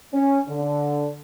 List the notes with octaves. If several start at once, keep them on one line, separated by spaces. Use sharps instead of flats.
C#4
D3